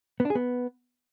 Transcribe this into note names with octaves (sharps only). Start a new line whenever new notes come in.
B3
D4
G#4
B3